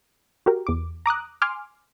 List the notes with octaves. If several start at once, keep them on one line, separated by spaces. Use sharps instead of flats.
F#4 G4 A#4
E2 D6
A#5 D6 D#6 F#6
G#5 C6 D6 F6